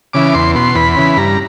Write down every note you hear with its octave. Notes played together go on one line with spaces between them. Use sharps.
C#3 E3 D6
E2 C6
B2 C6
E2 B5
C#3 E3
G2 A#5